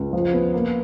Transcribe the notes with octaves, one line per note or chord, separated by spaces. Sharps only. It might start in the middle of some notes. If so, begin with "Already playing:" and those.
Already playing: C#2
F3
B3
A#3